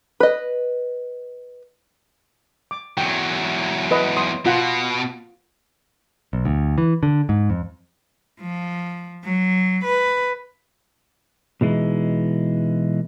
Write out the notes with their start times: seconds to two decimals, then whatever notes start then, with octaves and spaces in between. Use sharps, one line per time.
0.20 B4 D#5
2.71 D6
2.98 E2 F#3 G5
3.91 B4 D#5
4.17 C6 D#6
4.46 B2 F4 F#5
6.33 B1
6.45 D2
6.78 E3
7.03 D3
7.29 G#2
7.50 F2
8.40 F3
9.24 F#3
9.84 B4
11.61 B2 E3 G#3 D#4 E4